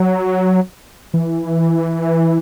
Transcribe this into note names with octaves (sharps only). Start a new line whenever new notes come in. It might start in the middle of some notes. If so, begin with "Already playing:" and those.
Already playing: F#3
E3